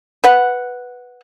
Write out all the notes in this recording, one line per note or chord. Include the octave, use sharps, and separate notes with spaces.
B4 F#5